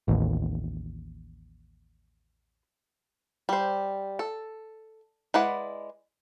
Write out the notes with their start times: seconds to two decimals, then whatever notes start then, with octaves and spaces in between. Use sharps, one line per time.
0.08 A1 D#2
3.49 G3 C5
4.19 A4
5.34 G#3 E4 B4 D5 F#5